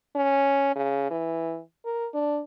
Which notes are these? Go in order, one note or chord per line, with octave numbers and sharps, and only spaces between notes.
C#4
C#3
E3
A#4
D4